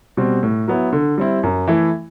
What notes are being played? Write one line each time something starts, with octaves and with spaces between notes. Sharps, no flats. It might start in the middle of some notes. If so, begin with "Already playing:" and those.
B2 G3 C4
A2
F#3 B3 E4
D3
G3 C4 E4
F#2
E3 A3 E4